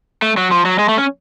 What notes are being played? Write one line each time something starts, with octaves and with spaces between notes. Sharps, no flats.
A3
F#3
F3
F#3
G#3
A3
C#4